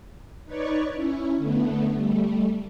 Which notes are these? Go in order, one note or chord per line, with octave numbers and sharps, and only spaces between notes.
D#4 B4 C#5 D5 C#6
C#4 E4
D3 A3 B3
G3 A3